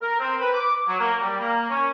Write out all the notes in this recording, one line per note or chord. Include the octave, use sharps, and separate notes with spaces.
A#4
C4
B4
D6
F#3
A#3
G3
A#3
C#4